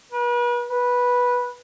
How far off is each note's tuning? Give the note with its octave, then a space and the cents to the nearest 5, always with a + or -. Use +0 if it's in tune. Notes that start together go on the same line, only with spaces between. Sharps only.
B4 -40
B4 -10